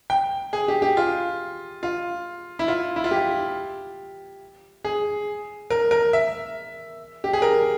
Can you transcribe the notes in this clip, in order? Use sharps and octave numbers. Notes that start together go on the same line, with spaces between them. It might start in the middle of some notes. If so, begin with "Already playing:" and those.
G5
G#4
G4
G4
F4
F4
E4
F4
E4
F4
G4
G#4
A#4
A#4
E5
G4
G#4
A#4